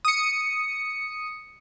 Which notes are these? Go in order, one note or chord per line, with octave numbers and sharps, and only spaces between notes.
D#6 C#7